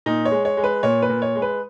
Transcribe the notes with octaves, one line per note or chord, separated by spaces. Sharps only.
A#2 D#4
C#5
G#3
C#5
G#3
B4
A#2 C#5
B4
A#2
C#5
G#3
B4